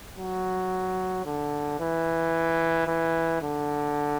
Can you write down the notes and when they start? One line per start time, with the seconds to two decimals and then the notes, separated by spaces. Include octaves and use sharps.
0.17 F#3
1.26 D3
1.80 E3
2.87 E3
3.42 D3